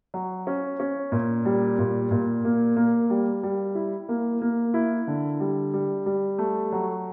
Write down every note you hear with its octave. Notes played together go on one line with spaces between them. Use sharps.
F#3
C#4
C#4
A#2
G3
A#2
A#2
A#3
A#3
G3
G3
E4
A#3
A#3
E4
D3
G3
G3
G3
A3
F#3